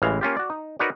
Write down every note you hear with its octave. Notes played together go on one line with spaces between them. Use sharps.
A1 C#3 E3 G#3 F5
A#3 C#4 F4 G4
F#4 D5
D#4
D#4 F#4 A#4 B4 C#5 D5